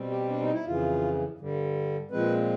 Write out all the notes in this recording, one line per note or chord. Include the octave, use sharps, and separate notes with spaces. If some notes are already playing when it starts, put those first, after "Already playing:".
Already playing: B2 G3 C4
G4
D4
D#4
E4
F2 C#3 E3 F4
G2 D3 G3
A#2 F3 G#3 C4 B4